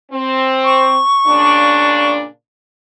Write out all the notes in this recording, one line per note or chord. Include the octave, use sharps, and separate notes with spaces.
C4
C#6
A#2 C#3 D4